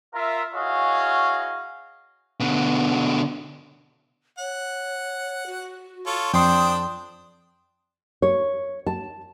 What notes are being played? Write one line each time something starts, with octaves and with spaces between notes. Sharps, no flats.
F4 A#4 E5
E4 F#4 G#4 C#5 D#5 F5
B2 D3
C#5 F#5
F#4
F4 A4 C#5
F2 D4 C5 G5 C6 D#6
C#5
A5